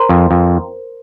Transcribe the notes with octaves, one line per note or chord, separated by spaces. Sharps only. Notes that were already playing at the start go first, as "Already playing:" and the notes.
Already playing: A#4 C5
F2
F2